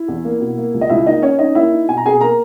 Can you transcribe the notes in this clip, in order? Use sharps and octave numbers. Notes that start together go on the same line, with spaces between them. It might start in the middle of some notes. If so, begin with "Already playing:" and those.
Already playing: E4
E2
A#3
B2
A#3
C#2
D#5
C#2 E4 E5
A#3 D#4 D#5
C#4 C#5
C#4 D#4 D#5
A#3 E4 E5
D#4
B2 G#5
A#5
B2 G#4 G#5
A#3 A#4 A#5